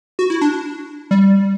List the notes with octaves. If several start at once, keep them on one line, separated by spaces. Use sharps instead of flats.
F#4
E4
D4
G3